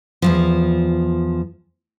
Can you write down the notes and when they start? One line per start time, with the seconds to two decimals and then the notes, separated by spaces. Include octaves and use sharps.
0.22 E2 G#2 F3